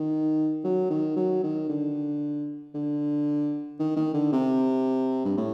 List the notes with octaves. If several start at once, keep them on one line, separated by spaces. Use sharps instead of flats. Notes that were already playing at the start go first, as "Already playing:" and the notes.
Already playing: D#3
F#3
D#3
F#3
D#3
D3
D3
D#3
D#3
D3
C3
G2
A2